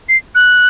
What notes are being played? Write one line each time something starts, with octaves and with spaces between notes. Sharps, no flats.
C7
F#6